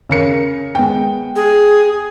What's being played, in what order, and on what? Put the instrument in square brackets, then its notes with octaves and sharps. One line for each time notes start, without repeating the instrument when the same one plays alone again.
[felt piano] C#3 A#4 C#7
G#3 B3 G5
[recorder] G#4